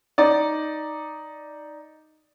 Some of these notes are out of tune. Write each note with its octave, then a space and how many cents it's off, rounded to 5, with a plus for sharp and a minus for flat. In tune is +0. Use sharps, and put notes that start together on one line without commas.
D#4 +0 D5 +0